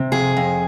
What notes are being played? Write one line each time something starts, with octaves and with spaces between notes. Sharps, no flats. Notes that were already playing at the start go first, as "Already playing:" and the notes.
Already playing: C3
F2 G#4
F2